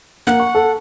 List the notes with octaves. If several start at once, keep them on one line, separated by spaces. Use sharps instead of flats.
A#3 F#5
C#6
A4